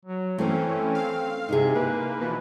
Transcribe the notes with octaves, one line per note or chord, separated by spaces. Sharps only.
F#3
E3 A3 C4 C#4 C5
F5
C3 D#4 E4 G#4
A#3 B4
B2 E3 F3